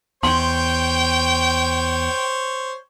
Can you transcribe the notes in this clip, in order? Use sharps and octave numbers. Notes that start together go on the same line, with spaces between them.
E2 C5 C#5 G5 C6